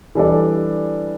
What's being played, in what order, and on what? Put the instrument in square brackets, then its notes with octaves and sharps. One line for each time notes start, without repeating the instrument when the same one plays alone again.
[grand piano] E3 G3 D4 A4 D5